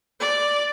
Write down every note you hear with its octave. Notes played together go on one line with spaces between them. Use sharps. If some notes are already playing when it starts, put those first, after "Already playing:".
D5